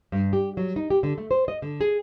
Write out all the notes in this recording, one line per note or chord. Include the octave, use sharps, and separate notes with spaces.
G2
G4
F#3
D#4
G4
D3
A3
C5
D#5
D3
G#4